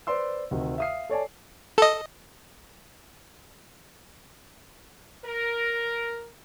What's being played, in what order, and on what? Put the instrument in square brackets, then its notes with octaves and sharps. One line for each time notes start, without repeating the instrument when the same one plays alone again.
[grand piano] B4 C5 D5 C6 E6
D2 C3 D#3
E5 F5 D#6 F6 C7
A4 C#5 D5 G#5 A5
[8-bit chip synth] A4 D#5
[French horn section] A#4